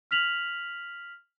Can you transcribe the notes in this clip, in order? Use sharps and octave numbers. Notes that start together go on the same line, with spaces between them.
F6 B6 F7 F#7